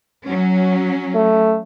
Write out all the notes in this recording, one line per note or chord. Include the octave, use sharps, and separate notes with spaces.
F#3 C#4
A3